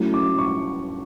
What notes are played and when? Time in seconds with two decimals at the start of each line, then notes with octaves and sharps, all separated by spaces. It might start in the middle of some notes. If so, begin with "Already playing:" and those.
Already playing: F#3 A3 C#4 E4
0.14 D6
0.38 C#6